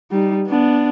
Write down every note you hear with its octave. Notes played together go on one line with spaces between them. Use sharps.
G3 D#4
B3 D4